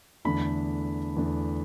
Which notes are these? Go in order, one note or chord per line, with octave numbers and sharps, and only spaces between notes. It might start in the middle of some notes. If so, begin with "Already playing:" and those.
E2 D3 A3 D4 B5
E2 D3 A3 D4